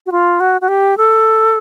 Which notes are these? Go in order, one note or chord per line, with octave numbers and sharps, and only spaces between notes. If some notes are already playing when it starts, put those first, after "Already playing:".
F#4
F4
F#4
F#4
G4
A4